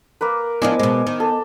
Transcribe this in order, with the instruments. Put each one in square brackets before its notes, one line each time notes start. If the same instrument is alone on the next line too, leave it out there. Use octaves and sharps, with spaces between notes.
[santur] A#3 A#4 B4
[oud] F3 D4 E4 [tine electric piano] B3 D#5 [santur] G#5 D6
[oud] B2 G#3
D#3
[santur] A4